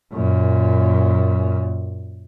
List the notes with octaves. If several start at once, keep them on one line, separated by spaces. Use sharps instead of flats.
F#2 A#2